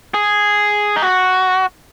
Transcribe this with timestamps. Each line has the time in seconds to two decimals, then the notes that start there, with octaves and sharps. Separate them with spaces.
0.14 G#4
0.96 D#4
1.02 F#4